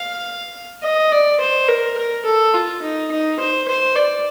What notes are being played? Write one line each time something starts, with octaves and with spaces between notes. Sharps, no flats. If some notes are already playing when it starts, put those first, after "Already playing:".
Already playing: F5
D#5
D5
C5
A#4
A#4
A4
F4
D#4
D#4
C5
C5
D5